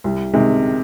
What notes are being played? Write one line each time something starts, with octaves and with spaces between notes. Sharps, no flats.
C2
C3 D#3 G#3